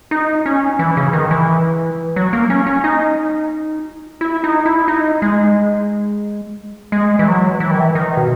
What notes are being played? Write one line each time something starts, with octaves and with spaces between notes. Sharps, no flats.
D#4
C#4
E3
C#3
D#3
E3
F#3
A#3
C#4
C#4
D#4
E4
D#4
E4
D#4
G#3
G#3
E3
F#3
E3
D#3
E3
D#3
B2